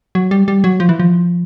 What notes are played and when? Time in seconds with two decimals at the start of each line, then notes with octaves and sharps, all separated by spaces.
0.15 F#3
0.31 G3
0.48 G3
0.64 F#3
0.80 F3
0.89 E3
1.00 F3